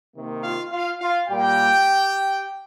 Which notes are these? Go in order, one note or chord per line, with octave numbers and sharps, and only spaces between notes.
C3 D#3 A#3
F4 F5
F4 F5
F4 F5
A#2 G3 A#3 G4 G5